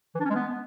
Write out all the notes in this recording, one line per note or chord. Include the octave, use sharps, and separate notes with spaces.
E3
D4
C#4
G#3
B3